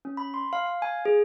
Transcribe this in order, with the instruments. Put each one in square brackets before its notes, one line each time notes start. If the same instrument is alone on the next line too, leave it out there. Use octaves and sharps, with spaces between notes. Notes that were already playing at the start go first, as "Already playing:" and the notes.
[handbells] C#4
B5
C6
F5
F5
G#5
G#4